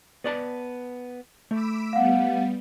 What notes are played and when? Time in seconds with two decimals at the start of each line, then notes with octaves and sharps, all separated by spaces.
0.24 B3 D5 A5
1.51 A3 B5 D6 E6
1.93 G3 B3 F5 F#5